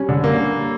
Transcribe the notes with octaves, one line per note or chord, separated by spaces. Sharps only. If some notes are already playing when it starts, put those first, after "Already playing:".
Already playing: G3 C#4
D3
A#3